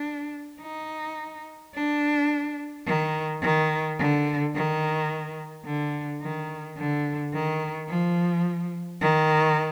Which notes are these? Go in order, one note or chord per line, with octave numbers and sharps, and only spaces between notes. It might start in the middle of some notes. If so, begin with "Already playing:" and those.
Already playing: D4
D#4
D4
D#3
D#3
D3
D#3
D3
D#3
D3
D#3
F3
D#3